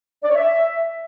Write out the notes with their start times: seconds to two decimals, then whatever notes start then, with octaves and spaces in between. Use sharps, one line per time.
0.23 D5
0.29 C#5
0.35 E5